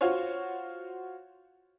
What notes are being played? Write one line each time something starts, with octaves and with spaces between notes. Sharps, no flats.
F4 F#4 C5 C#5